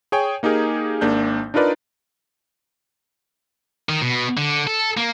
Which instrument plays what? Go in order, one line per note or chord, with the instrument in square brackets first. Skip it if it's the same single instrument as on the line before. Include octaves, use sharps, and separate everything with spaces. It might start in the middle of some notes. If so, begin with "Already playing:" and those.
[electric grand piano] G#4 C#5 G5 G#5
A#3 D#4 G4 G#4 A#4
G#1 A#3 D4 G6
D4 D#4 F4 A#4 B4 D5
[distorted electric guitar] D#3
B2
D3
A4
A#3